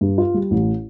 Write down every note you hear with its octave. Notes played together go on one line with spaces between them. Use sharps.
G2
F4
G3
A1